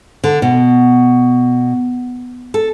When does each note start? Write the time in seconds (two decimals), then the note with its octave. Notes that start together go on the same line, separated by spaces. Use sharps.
0.24 D3
0.42 B2
2.54 A4